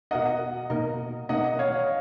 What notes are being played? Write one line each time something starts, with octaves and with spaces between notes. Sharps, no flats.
B2 A#3 D#4 D#5 F#5
B2 A#3 D#4
B2 A#3 D#4 D#5 F#5
C#5 F5